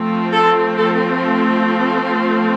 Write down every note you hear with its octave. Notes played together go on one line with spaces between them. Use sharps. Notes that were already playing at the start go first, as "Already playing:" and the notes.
Already playing: F3 A3 C4
A4
A4